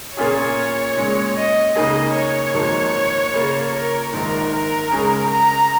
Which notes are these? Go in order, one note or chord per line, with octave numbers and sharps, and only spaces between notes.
A#2 A#3 C#4 F4 G#4 C#5
A#2 G#3 C#4
D#5
C#2 C#3 A#3 D#4 G#4 D#5
C#5
G#1 G#2 F3 A#3
C#3 A#3 F4
A#4
A#1 G#2 D#3 A#4
A#4
C#2 C#3 G#3 C#4 G#4
A#5